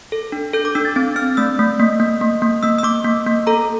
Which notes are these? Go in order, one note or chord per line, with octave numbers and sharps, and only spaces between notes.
A4
D4
A4 G6
D6
D4 E6
A6
C4 A6
C4 F6
A3 E6
A3
A#3
A#3
A#3
A#3
A#3 E6
E6
A#3 D6
A#3
A#3
A4 A#5